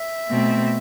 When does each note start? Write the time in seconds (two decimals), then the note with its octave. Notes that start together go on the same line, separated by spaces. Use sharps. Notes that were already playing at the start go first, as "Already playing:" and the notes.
Already playing: E5
0.29 B2 A3 C4